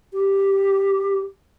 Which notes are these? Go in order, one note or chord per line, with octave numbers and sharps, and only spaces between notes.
G4